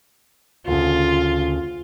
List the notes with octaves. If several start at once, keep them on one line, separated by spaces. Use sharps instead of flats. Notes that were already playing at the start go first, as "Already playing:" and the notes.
D2 C#3 F4